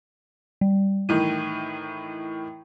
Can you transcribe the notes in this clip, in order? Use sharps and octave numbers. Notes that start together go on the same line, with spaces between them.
G3
A2 D#3 E3 D#7